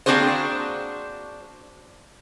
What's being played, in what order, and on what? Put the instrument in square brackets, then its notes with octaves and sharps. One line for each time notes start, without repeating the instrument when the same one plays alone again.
[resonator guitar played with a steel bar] A#3 C4 D4 F#4 G#4 C5